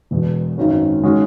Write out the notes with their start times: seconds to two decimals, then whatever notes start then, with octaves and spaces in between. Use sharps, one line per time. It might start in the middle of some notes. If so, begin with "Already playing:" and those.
0.11 E1 E2 B2
0.58 G#1 F#2 D#3 F#3 C#4
1.03 D#3 G#3 C#4 F#4